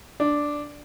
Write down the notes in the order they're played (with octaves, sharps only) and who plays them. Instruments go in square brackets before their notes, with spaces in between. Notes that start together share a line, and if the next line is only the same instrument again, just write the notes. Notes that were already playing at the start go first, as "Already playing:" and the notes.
[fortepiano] D4